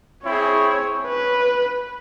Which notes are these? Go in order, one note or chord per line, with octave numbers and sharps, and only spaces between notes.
C4 E4 G#4 C#5
B4